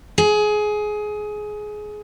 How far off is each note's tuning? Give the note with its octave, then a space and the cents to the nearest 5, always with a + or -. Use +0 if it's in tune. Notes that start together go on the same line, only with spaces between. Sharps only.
G#4 +20